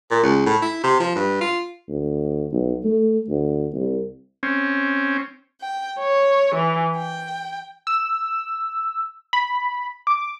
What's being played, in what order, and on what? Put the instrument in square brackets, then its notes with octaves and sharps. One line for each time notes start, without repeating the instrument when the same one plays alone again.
[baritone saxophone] A#2
C#2
A2
E4
C3
F3
G2
F4
[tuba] D2
B1
A3
D2
C2
[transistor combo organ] C4 C#4
[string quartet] G5
C#5
E3
G5
[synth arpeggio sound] E6
B5
D6